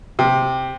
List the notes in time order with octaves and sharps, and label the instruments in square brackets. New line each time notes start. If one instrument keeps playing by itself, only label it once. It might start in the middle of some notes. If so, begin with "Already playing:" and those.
[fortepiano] C3